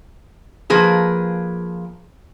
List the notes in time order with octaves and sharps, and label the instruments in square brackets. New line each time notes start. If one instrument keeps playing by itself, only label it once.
[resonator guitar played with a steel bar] F3 A#3 G#4 B4